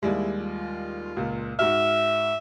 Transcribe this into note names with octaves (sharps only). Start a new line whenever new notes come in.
D#2 G3 G#3 E4
F4
C#2 A#2
G#2 F#4 E5 F6